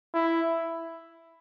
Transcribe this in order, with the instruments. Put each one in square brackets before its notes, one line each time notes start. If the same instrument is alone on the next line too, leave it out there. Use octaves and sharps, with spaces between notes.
[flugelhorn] E4